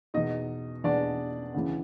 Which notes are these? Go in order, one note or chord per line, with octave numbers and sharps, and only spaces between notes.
E2 B2 D#4 D#5
E2 B2 D4 D5
D2 C#3 E3